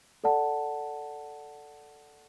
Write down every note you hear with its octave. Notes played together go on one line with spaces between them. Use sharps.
A4 D5 F#5 A5